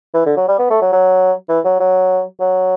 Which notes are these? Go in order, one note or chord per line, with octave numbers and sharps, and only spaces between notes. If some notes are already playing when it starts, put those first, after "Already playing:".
E3
D3
F#3
G3
B3
A3
F#3
F#3
E3
F#3
F#3
F#3